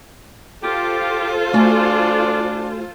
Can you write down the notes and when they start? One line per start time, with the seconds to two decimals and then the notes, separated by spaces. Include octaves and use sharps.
0.63 F4 G4 A4 C5
1.53 A3 D4 F#4 G#5